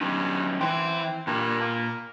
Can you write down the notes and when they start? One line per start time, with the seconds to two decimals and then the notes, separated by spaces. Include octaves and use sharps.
0.01 G2 F#3 C#4 D#4
0.61 E3 C4
1.27 G2 A#2 A#4
1.61 A#3